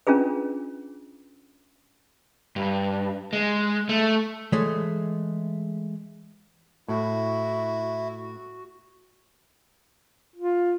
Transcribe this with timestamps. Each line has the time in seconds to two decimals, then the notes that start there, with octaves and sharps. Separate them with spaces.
0.07 C#4 D4 F4 G#4 B4
2.56 G2
3.33 G#3
3.89 A3
4.52 E3 G#3 A3 C#5 D#5
6.88 A2 E4 F#4
10.36 F4